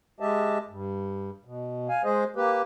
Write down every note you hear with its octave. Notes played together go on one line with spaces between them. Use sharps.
G#3 G4 D#5 E5 A5
G2
B2
F5 G#5
G#3 G#4 C5 D#5
A#3 G4 B4